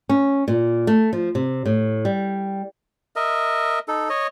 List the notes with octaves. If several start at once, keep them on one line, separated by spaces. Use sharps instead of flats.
C#4
A#2
A3
F3
C3
A2
G3
A#4 D#5 E5
D#4 A4
C#5 D#5